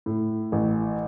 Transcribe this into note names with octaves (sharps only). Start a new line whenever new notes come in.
A2
A1